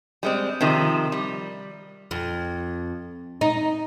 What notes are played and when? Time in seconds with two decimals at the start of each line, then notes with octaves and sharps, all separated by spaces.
0.23 G3 G#3 C4
0.61 C3 D#3 F3
1.12 G3
2.11 F2
3.41 D#4